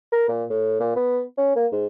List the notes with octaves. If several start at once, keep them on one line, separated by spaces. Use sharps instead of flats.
A#4
A#2
A2
A#2
B3
C#4
A#3
G#2